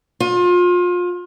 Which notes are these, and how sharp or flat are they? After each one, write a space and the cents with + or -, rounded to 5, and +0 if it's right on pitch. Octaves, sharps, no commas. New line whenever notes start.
F4 +30